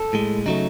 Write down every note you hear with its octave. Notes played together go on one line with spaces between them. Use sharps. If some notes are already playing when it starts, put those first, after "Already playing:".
Already playing: A4
A2 G#3
C#3 F#3 A3 D#4